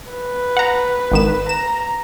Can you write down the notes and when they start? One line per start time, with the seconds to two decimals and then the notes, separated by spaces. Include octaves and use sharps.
0.10 B4
0.57 F#5 A#5
1.12 G#1 D#3 E7
1.49 A#5 E7